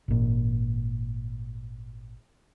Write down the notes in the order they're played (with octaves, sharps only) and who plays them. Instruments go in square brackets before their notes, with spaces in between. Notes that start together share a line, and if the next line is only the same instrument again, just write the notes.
[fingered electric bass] G#1 A#2